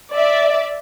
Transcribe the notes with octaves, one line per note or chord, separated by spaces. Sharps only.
D5 E5